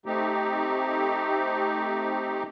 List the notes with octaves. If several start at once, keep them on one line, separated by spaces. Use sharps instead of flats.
A3 C4 D#4 G4